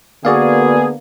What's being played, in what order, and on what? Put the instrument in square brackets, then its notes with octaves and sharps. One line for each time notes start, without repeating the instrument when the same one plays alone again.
[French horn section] D3 A#3 B3 [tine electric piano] F#4 D5 F5 [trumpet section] G#4